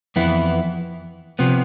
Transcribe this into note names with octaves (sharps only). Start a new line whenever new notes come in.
F2 E3 B3 E4
C3 F3 B3